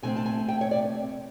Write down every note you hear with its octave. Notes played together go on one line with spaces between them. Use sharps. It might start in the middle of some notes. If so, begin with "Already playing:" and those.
C3 E3 A3 C4 G#5
A5
G#5
G5
C#5
D5